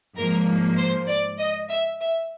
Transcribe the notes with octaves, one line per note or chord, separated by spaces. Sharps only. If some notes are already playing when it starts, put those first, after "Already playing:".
G#2 F3 A#3 A#4
C5
D5
D#5
E5
E5